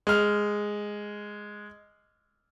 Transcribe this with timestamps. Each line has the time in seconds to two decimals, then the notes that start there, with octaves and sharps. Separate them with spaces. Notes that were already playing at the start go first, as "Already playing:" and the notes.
0.07 G#3 F6